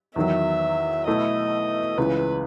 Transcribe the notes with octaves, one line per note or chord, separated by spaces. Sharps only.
E2 D#3 F#3 E5
B2 A3 E4 A4 D#5
C#2 C#3 E3 B4